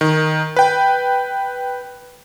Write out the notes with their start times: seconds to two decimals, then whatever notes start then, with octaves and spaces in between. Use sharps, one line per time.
0.01 D#3
0.56 B4 G5